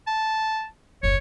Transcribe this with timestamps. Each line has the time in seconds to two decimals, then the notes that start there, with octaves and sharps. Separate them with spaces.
0.07 A5
1.03 F#1 D#2 C#5